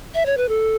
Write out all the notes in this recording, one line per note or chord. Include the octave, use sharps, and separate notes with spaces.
E5
C#5
B4
A4